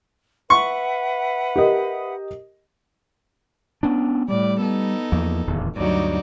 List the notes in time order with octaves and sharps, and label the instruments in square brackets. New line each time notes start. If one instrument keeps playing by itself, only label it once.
[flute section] B4 E5 F#5 [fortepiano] C#6
[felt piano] G4 A#4 D#5
[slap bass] B3 C#4 D4
[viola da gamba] A2 D5 [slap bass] G3
[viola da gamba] B3 D#4 A4
[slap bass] E2 F3 A#3
D1 E2 D#3
[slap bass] D2 G2 [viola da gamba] F#3 D#4 D5